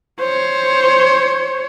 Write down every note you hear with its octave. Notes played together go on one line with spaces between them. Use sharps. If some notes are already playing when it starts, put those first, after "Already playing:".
C5 C#5